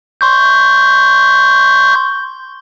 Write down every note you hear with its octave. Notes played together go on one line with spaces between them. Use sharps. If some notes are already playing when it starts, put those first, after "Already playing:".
C6 C#6 G6